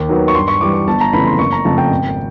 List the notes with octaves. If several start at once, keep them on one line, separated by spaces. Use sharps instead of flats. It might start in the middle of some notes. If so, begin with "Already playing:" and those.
Already playing: D#2
D#3 F#3 B3
C#6
G2 C6
C#6
E3 G3 D6
C#6
G1 A5
A#5
F2 C#3 E3 A3 B5
C6
F#1 C#6
A#5
F2 C#3 F3 A3 A5
G5
G#1